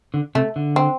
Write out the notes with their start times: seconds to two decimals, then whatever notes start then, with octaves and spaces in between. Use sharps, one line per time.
0.14 D3
0.35 C3 A3
0.56 D3
0.76 C4